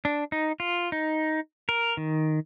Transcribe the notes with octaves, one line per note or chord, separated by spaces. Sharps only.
D4
D#4
F4
D#4
A#4
D#3